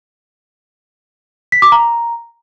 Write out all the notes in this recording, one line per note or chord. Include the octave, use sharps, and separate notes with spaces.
B6
D6
A#5